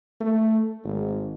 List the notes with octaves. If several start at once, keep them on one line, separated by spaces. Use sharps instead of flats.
A3
G#1